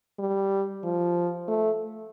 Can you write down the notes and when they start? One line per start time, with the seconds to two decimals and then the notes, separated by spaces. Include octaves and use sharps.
0.19 G3
0.84 F3
1.48 A3